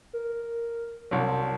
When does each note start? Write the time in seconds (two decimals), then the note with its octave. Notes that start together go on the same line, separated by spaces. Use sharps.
0.13 A#4
1.11 C2 F#3 A5